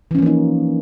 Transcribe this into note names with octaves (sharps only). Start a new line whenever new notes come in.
E3 F3 A#3 C#4 D#4